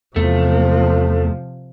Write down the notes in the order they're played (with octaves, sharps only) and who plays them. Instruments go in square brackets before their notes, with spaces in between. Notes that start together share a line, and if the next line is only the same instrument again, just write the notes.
[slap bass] E2 E3 [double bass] C3 F3 [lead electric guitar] A3